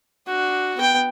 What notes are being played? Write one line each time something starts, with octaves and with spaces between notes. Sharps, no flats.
D4 F#4
B3 G5